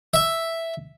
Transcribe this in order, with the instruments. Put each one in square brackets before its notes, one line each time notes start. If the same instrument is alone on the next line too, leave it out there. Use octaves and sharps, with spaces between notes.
[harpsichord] E5